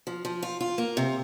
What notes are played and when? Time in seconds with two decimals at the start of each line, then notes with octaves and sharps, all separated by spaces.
0.07 F3
0.25 F3
0.43 F4
0.61 F4
0.78 A#3
0.97 C3